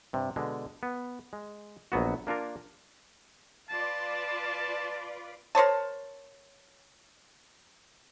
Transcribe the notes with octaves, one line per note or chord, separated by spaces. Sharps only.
G2 C3
B2 D3 G#3
B3
G#3
A#1 F#3 B3 F#4
A#3 D4 F4 A#4
F4 B4 D5 A5
A#4 C5 C#5 A5